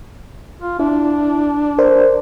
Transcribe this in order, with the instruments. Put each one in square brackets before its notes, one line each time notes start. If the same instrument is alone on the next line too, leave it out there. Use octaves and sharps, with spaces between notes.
[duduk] F4
[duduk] D4 [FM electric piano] E4
[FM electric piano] A#4 C5 D5